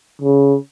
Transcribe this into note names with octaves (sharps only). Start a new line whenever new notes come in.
C#3